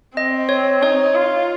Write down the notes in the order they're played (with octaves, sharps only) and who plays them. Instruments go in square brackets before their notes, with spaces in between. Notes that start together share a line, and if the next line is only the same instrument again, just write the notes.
[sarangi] C4 [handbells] D#5
[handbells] C#5
[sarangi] D#4 [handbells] C#5
[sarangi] F4